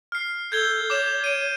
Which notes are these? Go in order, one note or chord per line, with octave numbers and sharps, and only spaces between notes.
F6 C7
A4 G6 G#6 G7
C#5 D6 E7
D7 D#7